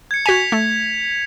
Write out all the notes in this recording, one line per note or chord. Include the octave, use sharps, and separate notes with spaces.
G#6 C#7
F#4 G#5 G#6 B6 F7
A3